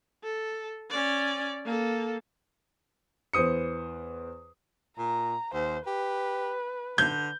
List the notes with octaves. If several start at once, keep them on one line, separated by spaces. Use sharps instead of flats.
A4
C#4 D5
A#3 A4
E2 E3 C5 D#6 C#7
A#2 A#5
D#2 C5
G4 B4
D3 G6